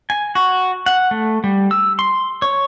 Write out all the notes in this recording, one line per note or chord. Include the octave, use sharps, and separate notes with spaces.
G#5
F#4
F#5
A3
G3
E6
C6
C#5